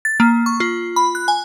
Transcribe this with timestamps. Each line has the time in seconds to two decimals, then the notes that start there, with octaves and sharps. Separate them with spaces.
0.05 A6
0.20 A#3
0.46 C#6
0.60 F4
0.96 B5
1.15 F#6
1.28 G#5